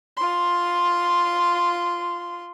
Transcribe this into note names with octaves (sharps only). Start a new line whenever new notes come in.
F4 C6